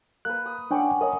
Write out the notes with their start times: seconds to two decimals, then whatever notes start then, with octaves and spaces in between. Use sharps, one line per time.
0.25 A#3 B4 F#6
0.46 D#6
0.71 C#4 D4 D5 F#5 G5
1.01 A#4 C#5 D#5